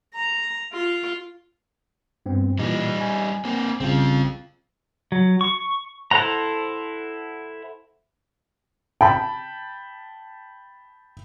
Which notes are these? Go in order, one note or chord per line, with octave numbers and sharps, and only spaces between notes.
A#5
F4
G2 B3 C4
A#2 E3 G3 D#4
G#5
A#3 C4
A#1 C#3 G3 C4 F4
F#3
C#6
E4 A4 C5 F#5 A#5
G5 A5 B5